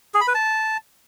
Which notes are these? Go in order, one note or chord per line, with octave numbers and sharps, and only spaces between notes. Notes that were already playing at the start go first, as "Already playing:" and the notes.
G#4
B5
B4
A5